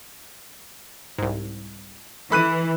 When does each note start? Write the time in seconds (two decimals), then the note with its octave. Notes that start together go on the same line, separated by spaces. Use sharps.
1.18 C2 G#2
2.32 E3 A4 B5 F#6 D#7